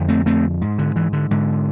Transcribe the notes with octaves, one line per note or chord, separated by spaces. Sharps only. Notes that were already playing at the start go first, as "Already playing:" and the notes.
Already playing: F2 D3
A3 C4
A3 C4
G#2
D3
E3
D3
G#2 D3